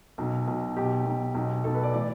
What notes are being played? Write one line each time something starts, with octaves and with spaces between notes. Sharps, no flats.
B1 B2
B1 B2
B1 B2 G4
B1 B2
B1 B2
B1 B2 A4
B4
D5
A2 E3 D5